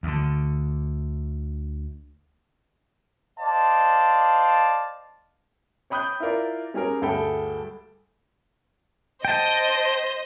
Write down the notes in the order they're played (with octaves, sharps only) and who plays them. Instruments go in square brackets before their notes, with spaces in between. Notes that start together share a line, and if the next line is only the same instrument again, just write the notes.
[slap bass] D2 D3
[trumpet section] C5 D5 D#5 F5 A5
[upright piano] C#5 G5 B5 D#6 F#6 G6
E4 F4 A#4 D5
G3 C#4 G#4 A#4
D2 G2 G#4 A4 G5 B5
[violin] C5 D#5 [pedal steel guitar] G5 A5